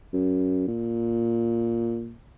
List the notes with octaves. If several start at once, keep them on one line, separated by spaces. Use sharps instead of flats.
F#2
A#2